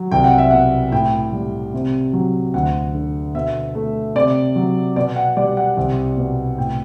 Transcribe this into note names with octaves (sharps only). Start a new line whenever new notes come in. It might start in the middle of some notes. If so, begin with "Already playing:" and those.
Already playing: F#3
C2 G5
F#5
E5
B2 F#5
A2 G5
G3
C3
F#3
D2 F#5
D3
B2 E5
A3
C3 D5
F#3
B2 D5
F#5
G3 D5
F#5
C2
B2
A2 G5